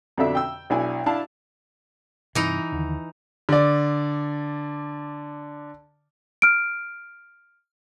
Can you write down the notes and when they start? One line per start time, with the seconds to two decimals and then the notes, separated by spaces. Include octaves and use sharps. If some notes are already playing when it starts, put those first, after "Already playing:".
0.17 F2 B2 D3 D4 E5
0.35 G5 E6
0.70 B1 D4 E4 G#5
1.06 D4 E4 F5 A5
2.35 G2 C3 E3 D#4
2.72 D#2 D3
3.49 D3 D5
6.42 F6 D7